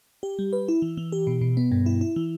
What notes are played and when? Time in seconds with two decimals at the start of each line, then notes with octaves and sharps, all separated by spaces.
0.23 G4
0.39 G3
0.53 B4
0.68 E4
0.82 E3
0.97 E3
1.12 G4
1.27 B2
1.41 B2
1.57 B3
1.72 G2
1.86 E4
2.01 E4
2.16 E3